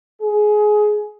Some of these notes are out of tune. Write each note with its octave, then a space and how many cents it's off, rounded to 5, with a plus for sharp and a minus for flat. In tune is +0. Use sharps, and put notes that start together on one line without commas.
G#4 +20